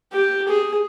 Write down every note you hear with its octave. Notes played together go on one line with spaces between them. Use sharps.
G4
G#4